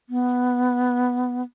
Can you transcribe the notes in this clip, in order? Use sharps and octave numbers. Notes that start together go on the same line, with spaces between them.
B3